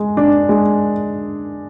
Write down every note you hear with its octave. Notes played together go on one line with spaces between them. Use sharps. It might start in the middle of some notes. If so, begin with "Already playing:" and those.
Already playing: G#3 G#4
D4
G#3